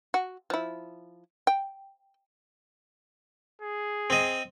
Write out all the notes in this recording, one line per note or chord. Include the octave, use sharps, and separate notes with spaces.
F#4
F3 E4
G5
G#4
C4 D#5